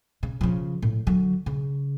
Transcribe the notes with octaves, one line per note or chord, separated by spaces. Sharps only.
C#3
C#3 F3
A2
D3 F#3
C#3